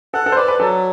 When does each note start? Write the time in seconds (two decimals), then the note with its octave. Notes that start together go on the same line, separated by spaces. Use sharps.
0.14 A4 F#5
0.26 A4
0.32 C5
0.37 B4 D5
0.48 B4
0.60 F#3 A4